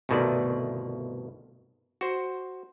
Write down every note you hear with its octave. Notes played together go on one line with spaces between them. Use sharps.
G1 C2 B2 D#3 A3 D5
F#4 C5